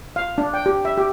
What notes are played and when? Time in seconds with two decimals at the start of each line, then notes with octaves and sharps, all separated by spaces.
0.16 F5
0.38 D4
0.54 G5
0.66 G4
0.85 E5
0.97 G4